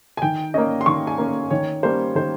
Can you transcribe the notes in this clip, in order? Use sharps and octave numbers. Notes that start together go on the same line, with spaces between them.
G#5
D#3 G5
A#3 C#4 D#5
C6
D#3 C#6
G#5
A#3 C#4
D#3 C#5
G3 A#3 C#4 C5
D#3 C5